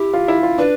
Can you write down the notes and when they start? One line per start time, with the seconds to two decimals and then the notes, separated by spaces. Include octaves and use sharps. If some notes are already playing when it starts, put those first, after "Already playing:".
Already playing: E4 G4
0.14 F4
0.28 E4
0.43 F4
0.58 D4 B4